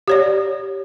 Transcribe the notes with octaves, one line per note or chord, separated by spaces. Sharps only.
G4 C#5 D5